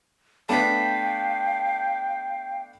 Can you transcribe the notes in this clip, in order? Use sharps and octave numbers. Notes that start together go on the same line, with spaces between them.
A3 B3 D4 F5 G5 A5 B6